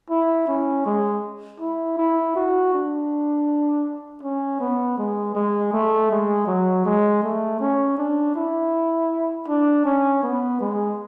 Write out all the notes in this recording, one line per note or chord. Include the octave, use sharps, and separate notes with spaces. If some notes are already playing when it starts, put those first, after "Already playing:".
E4
C#4
G#3
E4
E4
F#4
D4
C#4
B3
G#3
G#3
A3
G#3
F#3
G#3
A3
C#4
D4
E4
D4
C#4
B3
G#3